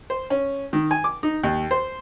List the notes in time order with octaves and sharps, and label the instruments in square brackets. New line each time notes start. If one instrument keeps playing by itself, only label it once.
[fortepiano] C5
C#4
D#3
G#5
D6
D#4
D#2
C5